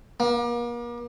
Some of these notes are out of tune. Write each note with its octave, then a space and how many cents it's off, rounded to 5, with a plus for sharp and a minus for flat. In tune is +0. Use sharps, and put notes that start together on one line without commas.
A#3 +40